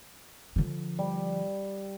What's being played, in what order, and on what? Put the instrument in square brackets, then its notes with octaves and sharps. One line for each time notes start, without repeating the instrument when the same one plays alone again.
[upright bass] D3 F3
[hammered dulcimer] G3